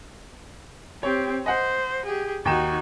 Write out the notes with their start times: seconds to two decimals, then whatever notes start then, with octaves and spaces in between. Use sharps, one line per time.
1.03 C4 G4 C#5
1.46 C5 D#5 F#5
2.06 G4 G#4
2.45 D#2 D#4 F#4 G5 E7